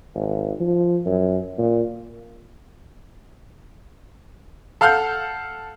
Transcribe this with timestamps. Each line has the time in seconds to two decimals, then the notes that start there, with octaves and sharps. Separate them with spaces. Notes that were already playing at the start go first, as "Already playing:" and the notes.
0.15 G#1
0.60 F3
1.06 F#2
1.58 A#2
4.81 A4 F5 F#5 F6 G6